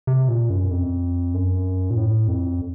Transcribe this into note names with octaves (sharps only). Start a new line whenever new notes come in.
C3
A#2
F#2
F2
F#2
A#2
A2
F2